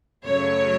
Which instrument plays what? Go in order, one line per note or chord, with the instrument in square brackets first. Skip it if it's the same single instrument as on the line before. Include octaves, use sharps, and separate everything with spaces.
[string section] F#2 C#3 F#3 A3 C#5